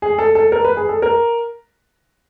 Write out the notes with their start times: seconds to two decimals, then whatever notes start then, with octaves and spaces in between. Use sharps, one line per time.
0.02 G#4
0.19 A4
0.35 A4
0.52 A#4
0.65 B4
0.77 G#4
0.89 A4
1.02 A#4